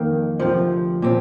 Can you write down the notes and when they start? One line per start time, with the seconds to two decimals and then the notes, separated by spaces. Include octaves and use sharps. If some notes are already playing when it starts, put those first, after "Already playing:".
Already playing: F2 D#3 A#3
0.40 D2 C3 F3
1.02 A#2 F3 C4